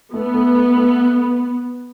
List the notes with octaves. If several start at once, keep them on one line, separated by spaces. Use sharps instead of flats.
A3 B3
A3
A3
A3